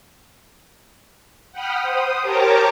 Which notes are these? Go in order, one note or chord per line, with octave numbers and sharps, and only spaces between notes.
F#5 G5 B5 D#6 F6
C5 D#6
G4 A#4 C#5 A5 A#5 D6